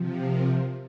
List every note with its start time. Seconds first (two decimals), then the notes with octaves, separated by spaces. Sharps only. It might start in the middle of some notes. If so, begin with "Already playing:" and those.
Already playing: C3 F3
0.27 A#4